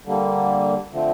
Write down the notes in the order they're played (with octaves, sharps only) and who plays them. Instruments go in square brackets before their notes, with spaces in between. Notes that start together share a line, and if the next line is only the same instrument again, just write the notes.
[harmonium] D3 G3 A#3
D3 F3 A3 C4